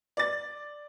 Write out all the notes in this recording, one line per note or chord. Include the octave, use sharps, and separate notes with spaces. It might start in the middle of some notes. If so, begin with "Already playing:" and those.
D5 A6